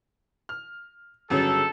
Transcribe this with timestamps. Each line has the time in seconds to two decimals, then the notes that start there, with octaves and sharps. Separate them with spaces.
0.49 F6
1.30 G1 C#3 F#3 A4